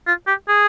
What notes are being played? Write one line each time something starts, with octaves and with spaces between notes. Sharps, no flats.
F4
G4
G#4